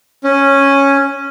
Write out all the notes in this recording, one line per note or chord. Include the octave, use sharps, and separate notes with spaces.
C#4